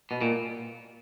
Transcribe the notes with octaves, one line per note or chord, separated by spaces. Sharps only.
B2
A#2